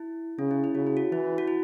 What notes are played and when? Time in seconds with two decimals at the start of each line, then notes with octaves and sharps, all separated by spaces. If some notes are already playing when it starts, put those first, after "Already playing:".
Already playing: E4
0.39 C#3 C#4
0.51 E4
0.64 E4
0.75 C#3 F#4
0.87 E4
0.97 F#4
1.12 E3 E4
1.38 F#4
1.48 E4